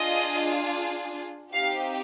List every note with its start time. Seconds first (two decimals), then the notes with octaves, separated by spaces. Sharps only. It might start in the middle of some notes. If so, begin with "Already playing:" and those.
Already playing: D4 F4 G#4 D#5
1.53 C4 D#4 G4 F5